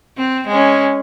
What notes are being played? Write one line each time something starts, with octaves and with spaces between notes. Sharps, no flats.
C4
G#3 C#4